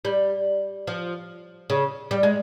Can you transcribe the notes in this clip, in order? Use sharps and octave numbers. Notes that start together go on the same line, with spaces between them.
G3
F3
C#3
G3
G#3